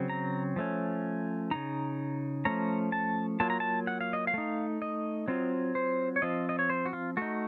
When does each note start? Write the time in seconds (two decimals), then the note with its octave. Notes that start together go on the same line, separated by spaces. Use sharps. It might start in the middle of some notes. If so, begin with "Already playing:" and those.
Already playing: C#3 F#3 C4
0.09 A#5
0.56 F3 A3 C#4
1.51 C#3 A3 D#4 A#5
2.45 F3 A3 C#4 A#5
2.92 A5
3.40 F#3 A#3 F4 A5
3.50 A#5
3.60 A5
3.87 F#5
4.01 F5
4.13 D#5
4.27 F5
4.34 A3 D#4
4.82 D#5
5.28 F#3 C4 F4
5.75 C5
6.16 C#5
6.22 F3 C4 F4 D#5
6.49 D#5
6.59 C#5
6.70 C5
6.86 F#4
6.93 F4
7.17 A3 D#4 F#4